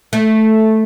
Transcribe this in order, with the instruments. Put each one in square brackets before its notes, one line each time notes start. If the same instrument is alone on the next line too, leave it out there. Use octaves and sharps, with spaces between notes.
[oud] A3